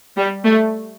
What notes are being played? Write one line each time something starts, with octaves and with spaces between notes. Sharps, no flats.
G3
A3